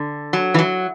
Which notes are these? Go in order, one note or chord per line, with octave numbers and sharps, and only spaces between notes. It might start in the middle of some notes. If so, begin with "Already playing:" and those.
Already playing: D3
F#3
E3
F#3